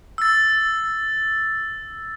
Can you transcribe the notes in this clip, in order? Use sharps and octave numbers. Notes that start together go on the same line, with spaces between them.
E6 A6